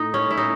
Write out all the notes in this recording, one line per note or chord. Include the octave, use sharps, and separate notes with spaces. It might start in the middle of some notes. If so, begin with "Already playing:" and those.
Already playing: A2 D#4
C#4
E4
D#4